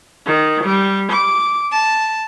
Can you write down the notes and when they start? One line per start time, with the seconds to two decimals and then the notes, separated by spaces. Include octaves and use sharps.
0.25 D#3
0.64 G3
1.11 D6
1.73 A5